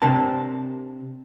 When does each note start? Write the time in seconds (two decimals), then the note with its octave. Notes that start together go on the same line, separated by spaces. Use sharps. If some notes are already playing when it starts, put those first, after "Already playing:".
0.02 C3 D4 A#4 C5 A5